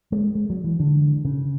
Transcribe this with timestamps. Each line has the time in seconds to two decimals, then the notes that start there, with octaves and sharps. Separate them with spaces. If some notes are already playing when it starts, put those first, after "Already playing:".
0.12 G#3
0.35 G#3
0.50 F#3
0.64 E3
0.80 D3
1.25 C#3